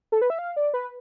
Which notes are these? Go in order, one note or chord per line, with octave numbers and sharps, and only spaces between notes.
A4
B4
E5
F5
D5
B4